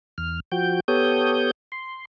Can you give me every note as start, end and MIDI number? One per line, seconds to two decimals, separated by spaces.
0.18 0.40 40
0.18 0.40 89
0.52 0.80 53
0.52 0.80 66
0.52 0.80 79
0.52 0.80 91
0.88 1.51 59
0.88 1.51 67
0.88 1.51 69
0.88 1.51 73
0.88 1.51 87
0.88 1.51 91
1.72 2.05 84